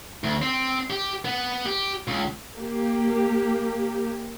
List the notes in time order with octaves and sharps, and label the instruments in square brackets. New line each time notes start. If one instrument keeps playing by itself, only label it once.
[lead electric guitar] D2
C4
G4
B3
G4
C#2
[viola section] A#3 G4